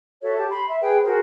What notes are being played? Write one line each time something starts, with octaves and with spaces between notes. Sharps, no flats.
F#4 A4 C#5 E5
G4 A5
B5 C6
E5
G#4 B4 G5
F#4 G#4 A#4 C5